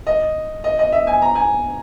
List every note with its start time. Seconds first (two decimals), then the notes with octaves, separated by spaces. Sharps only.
0.07 D#5
0.64 D#5
0.79 D#5
0.92 E5
1.07 G#5
1.22 A#5
1.35 G#5